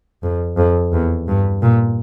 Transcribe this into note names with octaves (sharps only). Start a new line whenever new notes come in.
F2
F2
E2
G2
A#2